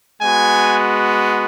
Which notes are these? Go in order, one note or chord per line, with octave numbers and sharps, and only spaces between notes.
G#3 B3 F#4 G#5